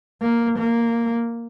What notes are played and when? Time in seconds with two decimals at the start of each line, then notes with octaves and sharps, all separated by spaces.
0.21 A#3
0.58 A#3